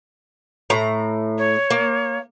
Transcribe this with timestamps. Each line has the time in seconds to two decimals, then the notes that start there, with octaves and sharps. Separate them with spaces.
0.70 A2 A#5
1.38 C#5
1.71 A#3